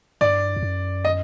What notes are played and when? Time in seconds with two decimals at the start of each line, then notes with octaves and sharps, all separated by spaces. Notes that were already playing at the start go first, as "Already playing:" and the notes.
0.21 G2 D5
0.56 F2
0.62 F#2
1.05 D#5